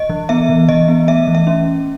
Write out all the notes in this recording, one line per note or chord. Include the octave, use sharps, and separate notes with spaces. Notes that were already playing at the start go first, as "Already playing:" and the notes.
Already playing: D#5
E3
B3 E5
E3
E3 D#5
B3
A3 E5
E3
E5
C#4